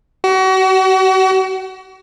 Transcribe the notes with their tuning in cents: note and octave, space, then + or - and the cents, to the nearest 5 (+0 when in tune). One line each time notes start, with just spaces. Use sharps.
F#4 +35